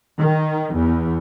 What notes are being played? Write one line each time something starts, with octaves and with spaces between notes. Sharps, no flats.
D#3
E2